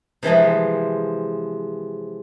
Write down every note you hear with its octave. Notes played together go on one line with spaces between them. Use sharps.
C3 E3 F3 G#3